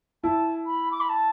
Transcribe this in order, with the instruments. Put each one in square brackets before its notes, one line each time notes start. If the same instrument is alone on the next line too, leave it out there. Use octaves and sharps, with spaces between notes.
[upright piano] E4 [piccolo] A5
[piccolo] B5
D6
B5
A5